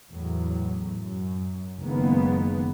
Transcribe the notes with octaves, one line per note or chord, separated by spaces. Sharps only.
E2 A2 F#3
F#2
F#1 D#3 G#3 A#3 B3